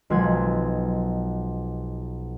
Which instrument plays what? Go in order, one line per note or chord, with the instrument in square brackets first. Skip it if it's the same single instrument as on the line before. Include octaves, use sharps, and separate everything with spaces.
[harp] B1 F3 G#3 B4 G#6